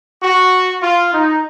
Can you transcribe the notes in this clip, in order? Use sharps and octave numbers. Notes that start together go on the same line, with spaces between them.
F#4
F4
D#4